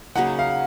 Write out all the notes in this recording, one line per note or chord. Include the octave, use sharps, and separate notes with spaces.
C#3 F#3 A#3 D#4 F#5
F5